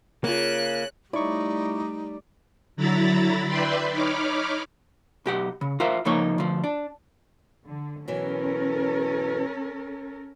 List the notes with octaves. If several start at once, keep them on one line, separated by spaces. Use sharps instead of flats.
C#3 A#3 F4 F#6
G3 A3 D#4 E4 D5 C#6
D3 F#3 E4 A#5 B5 A6
B4 D5 E5 G5 B5 C6
D#4 C#5 B5 D6 F6
B1 G4 F#5
C#3
F4 A#4 C5 E5
C#2 F3 A#3 D#4 C#5
D2 F3
D4
D3
B2 E3 F#3 C#4 A4 A#4